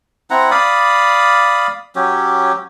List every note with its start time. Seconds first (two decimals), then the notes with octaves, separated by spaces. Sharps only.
0.30 C4 E4 F#5 A#5
0.51 D5 F5 B5 D#6
1.96 F#3 C#4 G4